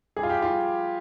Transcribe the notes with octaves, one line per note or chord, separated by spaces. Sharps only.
G3 G#4
F4
G4
G3 F4